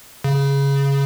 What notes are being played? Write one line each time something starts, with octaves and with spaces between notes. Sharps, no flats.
C#3